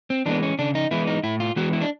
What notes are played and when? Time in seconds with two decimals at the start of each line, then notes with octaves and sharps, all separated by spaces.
0.10 C4
0.26 E3 G#3 B3 D4
0.43 C#4
0.59 C#3 D4
0.75 D#4
0.91 E3 G#3 B3 E4
1.07 D#4
1.24 A2 E4
1.40 F4
1.56 E3 G#3 B3 F#4
1.73 E4
1.81 D4